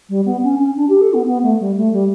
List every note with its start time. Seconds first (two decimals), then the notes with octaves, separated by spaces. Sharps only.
0.09 G3
0.25 B3
0.43 C#4
0.59 C#4
0.76 D4
0.89 G4
1.01 A4
1.13 B3
1.26 B3
1.42 A3
1.59 G3
1.76 A3
1.92 G3